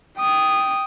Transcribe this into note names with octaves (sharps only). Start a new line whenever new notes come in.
G5 D#6